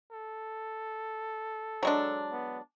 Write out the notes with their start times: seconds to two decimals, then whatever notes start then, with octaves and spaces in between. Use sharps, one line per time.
0.12 A4
1.83 F#3 G#3 D4
2.31 B3